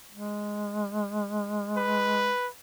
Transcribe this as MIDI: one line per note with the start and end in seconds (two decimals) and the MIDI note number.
0.12 2.31 56
1.77 2.48 71